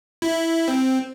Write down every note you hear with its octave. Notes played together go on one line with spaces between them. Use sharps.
E4
C4